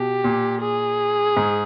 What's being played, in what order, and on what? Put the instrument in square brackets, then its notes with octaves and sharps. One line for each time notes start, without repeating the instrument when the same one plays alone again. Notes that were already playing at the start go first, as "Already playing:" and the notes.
Already playing: [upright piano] B2 [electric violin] G4
[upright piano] A#2
[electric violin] G#4
[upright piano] G#2